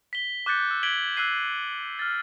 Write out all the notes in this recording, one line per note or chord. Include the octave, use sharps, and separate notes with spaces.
B6 G7
D6 F#6 G6 A6 C#7
E6
G#6 B6 D7 F#7 G7
E6 F#6 G6 C7 D#7
F6 A6